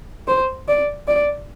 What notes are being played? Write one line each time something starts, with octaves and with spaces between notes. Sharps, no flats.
C5
D5
D5